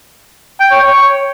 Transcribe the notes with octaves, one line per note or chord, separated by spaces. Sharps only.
G5
C#5
C#5